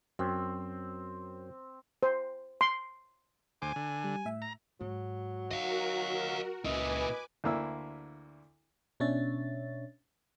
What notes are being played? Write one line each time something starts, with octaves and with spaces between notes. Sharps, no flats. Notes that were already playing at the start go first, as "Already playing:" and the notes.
F#2 C4
C5
C6
D2 C5 G#5 D6
D3
G3
A2 E5
A#5
G#2 F#3
D#4 F#4 A#4 D#5 F5
C#2 A#2 E4 B4 D#5 G#5 D6
D2 D3 A#3 E4 E6
B2 C#4 D4 C#5 E5 A6